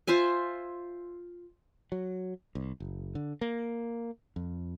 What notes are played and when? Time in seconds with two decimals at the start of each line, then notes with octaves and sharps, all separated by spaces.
0.07 F4 C5 E5 G#5
1.92 F#3
2.55 C2
2.80 F#1
3.15 D3
3.41 A#3
4.36 F2